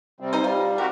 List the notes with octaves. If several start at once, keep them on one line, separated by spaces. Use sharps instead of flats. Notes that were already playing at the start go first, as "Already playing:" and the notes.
C3 G3 C4
D#4 C5
G3 F4
C4 F#4 G4 A#4